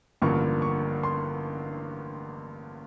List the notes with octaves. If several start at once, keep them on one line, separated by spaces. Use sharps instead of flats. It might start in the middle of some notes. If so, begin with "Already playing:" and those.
A1 G2 D3 F3 A#3 C#6
C#6
C6